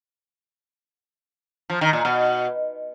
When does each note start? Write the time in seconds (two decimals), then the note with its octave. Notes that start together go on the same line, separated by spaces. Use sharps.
1.70 F3
1.81 D#3
1.93 A#2
2.05 B2